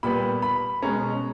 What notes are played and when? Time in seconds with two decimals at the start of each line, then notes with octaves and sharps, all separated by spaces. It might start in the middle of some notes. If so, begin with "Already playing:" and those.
0.03 A#2 G3 B3 B5
0.42 B5
0.82 B2 G#3 C#4 A#5